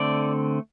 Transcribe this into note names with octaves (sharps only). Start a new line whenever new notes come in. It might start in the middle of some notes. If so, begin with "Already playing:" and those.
Already playing: D3 A3 C4 D5